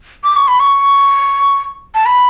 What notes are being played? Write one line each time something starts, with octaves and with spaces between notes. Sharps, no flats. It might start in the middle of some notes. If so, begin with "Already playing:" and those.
D6
C#6
B5
C#6
A5
B5